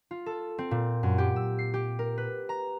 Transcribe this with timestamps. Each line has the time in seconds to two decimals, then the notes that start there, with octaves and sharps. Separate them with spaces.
0.11 F4
0.26 A4
0.58 C4
0.71 A#2
1.03 F#2
1.18 G4
1.36 E6
1.59 C7
1.74 G4
1.99 A#4
2.18 B4
2.49 A#5